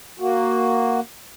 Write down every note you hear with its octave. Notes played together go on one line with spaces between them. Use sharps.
A#3 F#4